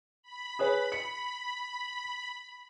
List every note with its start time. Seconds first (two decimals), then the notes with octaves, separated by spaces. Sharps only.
0.23 B5
0.59 G#4 B4 C#5
0.92 C#7